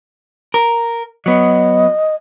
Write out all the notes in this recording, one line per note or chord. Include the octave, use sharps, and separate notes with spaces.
A#4
F#3 B3 D#5